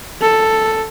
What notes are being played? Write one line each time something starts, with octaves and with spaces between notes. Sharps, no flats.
A4